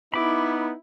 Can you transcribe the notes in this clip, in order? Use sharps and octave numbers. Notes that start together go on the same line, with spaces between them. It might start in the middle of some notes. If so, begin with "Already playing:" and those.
B3 D#4 E4 B5 D6